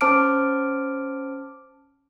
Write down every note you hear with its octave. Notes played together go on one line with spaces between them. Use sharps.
C#4 C5 A5 D6 F6 D7